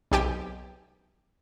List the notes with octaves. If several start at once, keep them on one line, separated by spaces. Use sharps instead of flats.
B1 C3 G4 G5 G#5 D7